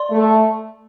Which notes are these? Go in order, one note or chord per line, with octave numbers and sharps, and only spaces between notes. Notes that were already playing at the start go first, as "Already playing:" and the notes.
Already playing: D5 C6
A3